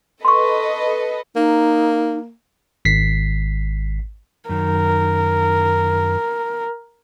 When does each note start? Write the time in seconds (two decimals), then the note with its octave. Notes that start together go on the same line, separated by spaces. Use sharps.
0.25 A4 B4 D#5 C6 C#6
1.36 A#3 D#4
2.85 G#1 B6 C7
4.49 F#2 D#3 A#4